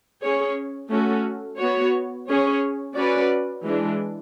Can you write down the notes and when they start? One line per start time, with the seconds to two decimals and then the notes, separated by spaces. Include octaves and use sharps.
0.21 C#4 G#4 C#5
0.90 A3 C#4 F#4 A4
1.58 B3 F#4 C#5
2.27 C#4 G#4 C#5
2.95 C#4 F#4 B4 D5
3.64 E3 G#3 D4